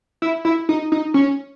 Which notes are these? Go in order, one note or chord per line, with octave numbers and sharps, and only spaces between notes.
E4
E4
D#4
D#4
C#4